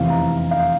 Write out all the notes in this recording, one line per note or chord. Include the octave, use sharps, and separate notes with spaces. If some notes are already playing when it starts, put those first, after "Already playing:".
Already playing: F1 E2 C3 E3 F5
A#5
F5